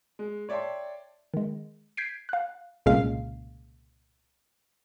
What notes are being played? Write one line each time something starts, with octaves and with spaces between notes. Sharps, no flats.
G#3
C#5 D5 E5 G5 A5 C6
D#3 G#3
G6 G#6 B6 C7 D7
F5 F#6
C2 A#2 C#3 G#3 F5 C7